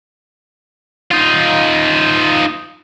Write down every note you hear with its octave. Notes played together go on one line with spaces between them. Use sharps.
D#4 F4